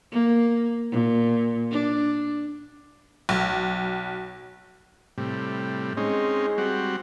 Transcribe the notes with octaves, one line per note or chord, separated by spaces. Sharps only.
A#3
A#2
D4
B1
A2 C3 G3
G#3 C4 C#4 D#4
G3 C4 F#4